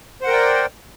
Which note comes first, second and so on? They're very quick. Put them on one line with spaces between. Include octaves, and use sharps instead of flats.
C5 F#5 A#4 G5 D5